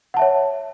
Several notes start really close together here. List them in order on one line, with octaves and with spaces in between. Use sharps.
F#5 A5 E5 C#5